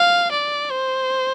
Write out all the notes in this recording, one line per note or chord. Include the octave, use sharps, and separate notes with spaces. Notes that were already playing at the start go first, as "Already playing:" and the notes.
Already playing: F5
D5
C5